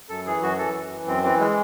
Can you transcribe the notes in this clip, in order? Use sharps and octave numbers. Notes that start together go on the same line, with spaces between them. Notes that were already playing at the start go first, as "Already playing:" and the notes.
F#2 A4
E3 G#4
F#2 F#4
E3 A4
F#2
E3
F#2 C4
E3 C4
G#3